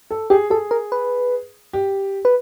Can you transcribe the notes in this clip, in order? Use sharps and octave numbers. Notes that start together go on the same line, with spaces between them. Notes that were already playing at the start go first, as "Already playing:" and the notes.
A4
G4 G#4
G#4 A4
A#4
B4
G4
B4